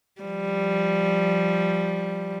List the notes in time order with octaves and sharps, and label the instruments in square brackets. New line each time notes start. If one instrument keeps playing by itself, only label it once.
[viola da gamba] F3 G3